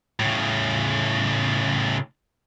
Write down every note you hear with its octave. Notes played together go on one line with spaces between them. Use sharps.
A2 C#3